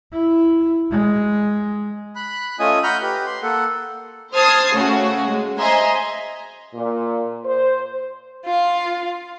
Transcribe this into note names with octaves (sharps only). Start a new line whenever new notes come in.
E4
G#3
B5 F#6
A3 C#4 F4 D#5 G#5 D#6
F#5 A#5 B5 F6 G6
G4 B4
C6
A#3 A4 F#5
C5 A5 D#6 F6 G#6 C7
C#3 A3 F#4
G#3
C5 D#5 E5 G#5 A#5 C6
A#2
C5
F4 F5